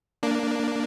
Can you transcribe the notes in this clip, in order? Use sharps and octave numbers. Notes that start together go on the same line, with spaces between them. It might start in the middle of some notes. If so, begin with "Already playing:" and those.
A#3 D4